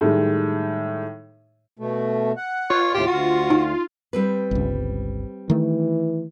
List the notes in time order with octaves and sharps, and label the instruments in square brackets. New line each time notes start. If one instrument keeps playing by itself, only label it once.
[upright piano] A2 D#3 G3 G#3
[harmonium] B2 A3
F#5
[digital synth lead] F4 [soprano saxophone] C#5
[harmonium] D#2 A2 C3 [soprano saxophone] G4
[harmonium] D2 [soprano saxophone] F#4
[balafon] D#4
[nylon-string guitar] G3 C4 B4
[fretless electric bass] G1 C#2
[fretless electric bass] D#3 A3 [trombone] E3